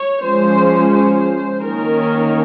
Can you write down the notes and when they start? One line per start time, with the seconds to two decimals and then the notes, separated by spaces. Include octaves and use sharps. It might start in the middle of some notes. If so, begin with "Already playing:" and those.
Already playing: C#5
0.23 F3 G#3 C#4 C5
0.94 C5
1.65 D#3 A#3 C#4 A#4